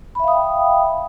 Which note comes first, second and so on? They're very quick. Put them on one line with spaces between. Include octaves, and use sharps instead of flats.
B5 E5 F5 D#6 G5